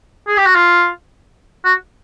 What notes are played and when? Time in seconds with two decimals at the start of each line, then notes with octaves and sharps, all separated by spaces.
0.28 G#4
0.37 G4
0.46 F#4
0.55 F4
1.65 F#4